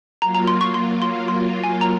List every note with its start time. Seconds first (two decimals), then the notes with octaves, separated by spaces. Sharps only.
0.22 F#3 A#3 F4 A#5
0.35 A#5
0.48 C6
0.61 C#6
0.74 C6
1.02 C6
1.28 C6
1.64 G#5
1.81 A#5